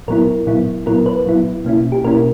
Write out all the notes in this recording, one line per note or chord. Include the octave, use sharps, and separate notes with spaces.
A#2 F#3 B3 E4 A#4
A#2 F#3 B3 E4
A#2 F#3 B3 E4 A#4
B4
A#2 F#3 B3 E4
B2 A#3 C#4 E4
G4
B2 A#3 C#4 E4 A#4